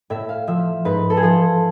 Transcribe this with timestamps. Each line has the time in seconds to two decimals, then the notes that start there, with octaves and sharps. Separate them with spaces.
0.10 A2 E5
0.29 F5
0.47 F3 E5
0.85 G#2 B4
1.10 A4
1.17 G#4
1.23 F3 A4